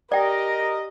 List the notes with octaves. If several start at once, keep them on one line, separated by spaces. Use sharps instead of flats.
G4 A#4 D5 D#5 G5